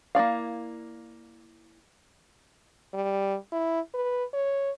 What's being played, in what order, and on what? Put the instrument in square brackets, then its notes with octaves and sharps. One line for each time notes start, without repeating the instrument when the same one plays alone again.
[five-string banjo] A#3 E4 D5 F5
[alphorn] G3
E4
B4
C#5